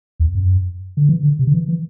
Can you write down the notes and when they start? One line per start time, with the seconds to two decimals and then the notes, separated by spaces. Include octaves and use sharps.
0.20 E2
0.35 F#2
0.97 D3
1.09 E3
1.23 D3
1.39 C3
1.47 D3
1.54 E3
1.68 E3